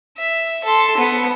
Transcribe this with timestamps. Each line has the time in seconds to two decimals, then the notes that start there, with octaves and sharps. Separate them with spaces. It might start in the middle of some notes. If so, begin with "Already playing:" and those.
0.17 E5
0.64 A4 C6
0.98 B3